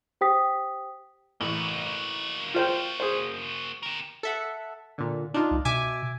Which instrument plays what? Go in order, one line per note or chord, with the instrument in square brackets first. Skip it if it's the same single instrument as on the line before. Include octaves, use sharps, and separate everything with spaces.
[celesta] G4 C5 G5 D#6 B6
[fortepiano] A1 [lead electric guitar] A#3 F#4
[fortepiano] F4 C5 G5
G#4 C5
[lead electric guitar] G4 A#4
[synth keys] A4 E5 F#5
A#2 D3
D4 D#4 F4
[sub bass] C2
[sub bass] B2 [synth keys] E5 G#5 D6